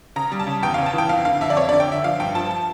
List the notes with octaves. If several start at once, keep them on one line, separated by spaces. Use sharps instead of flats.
C#3 A#5
G3
A5
C#3
E2 G5
F5
C#3
A5
E3 G5
F2 F5
D3 F5
F2 E5
D5
F2 C#5
D5
D3
G5
D3 E5
F3 F5
G2 G5
F3 A5
A5